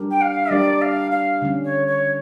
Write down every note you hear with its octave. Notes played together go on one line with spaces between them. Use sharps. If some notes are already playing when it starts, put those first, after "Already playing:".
Already playing: G3 D4 G4 A#4
G5
F5
G3 D4 G4 A#4 D5
F5
F5
D3 G3 C#4
C#5
C#5